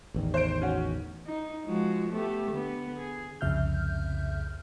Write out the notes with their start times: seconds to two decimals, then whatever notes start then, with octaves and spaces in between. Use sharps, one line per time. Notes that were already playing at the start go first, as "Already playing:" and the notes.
0.14 A1 E2 D#3
0.34 C5 G6 D7
0.62 C#4 F#4
1.27 D#4
1.64 F3 G#3 F#4
2.10 A3 B3 G4
2.51 D3 B3
2.97 G#4
3.41 C2 F2 C#3 E5 F6 G6